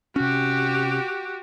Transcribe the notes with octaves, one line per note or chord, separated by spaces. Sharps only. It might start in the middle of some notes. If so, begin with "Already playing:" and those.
C3 C#4 F#4 G4